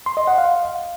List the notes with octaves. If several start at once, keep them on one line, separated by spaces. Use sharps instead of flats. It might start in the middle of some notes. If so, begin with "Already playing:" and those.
C6
D#5
F#5
F5